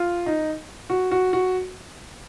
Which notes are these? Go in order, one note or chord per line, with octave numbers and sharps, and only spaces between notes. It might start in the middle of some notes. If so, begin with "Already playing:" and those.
Already playing: F4
D#4
F#4
F#4
F#4